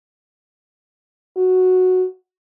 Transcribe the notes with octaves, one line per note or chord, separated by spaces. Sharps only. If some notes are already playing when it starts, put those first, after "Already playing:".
F#4